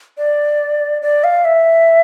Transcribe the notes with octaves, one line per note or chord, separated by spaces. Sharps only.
D5
D5
F5
E5